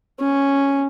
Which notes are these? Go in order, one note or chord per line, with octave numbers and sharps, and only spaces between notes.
C#4